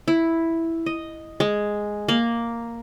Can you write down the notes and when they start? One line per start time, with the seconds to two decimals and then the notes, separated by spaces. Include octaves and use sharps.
0.08 E4
0.86 D#5
1.40 G#3
2.08 A#3